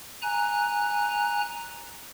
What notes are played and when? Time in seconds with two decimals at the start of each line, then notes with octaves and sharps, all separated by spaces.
0.22 G#5 A#5 F#6